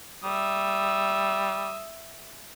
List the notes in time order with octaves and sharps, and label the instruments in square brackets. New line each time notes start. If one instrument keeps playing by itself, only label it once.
[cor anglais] G3 [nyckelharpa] E5 D#6